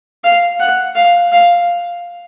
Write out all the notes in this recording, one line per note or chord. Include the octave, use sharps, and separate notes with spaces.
F5
F#5
F5
F5